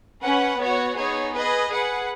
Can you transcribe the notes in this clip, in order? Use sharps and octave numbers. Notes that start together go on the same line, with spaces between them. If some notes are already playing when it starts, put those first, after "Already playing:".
C#4 B4 F#5
B3 F#4 C#5 F#5
B3 D#4 G#4 C#5
G#4 B4 D#5
G#4 B4 F#5